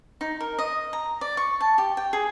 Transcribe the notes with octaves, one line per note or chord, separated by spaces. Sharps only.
D#4
A#4
D#5
A#5
D5
C#6
A5
G4
G5
G#4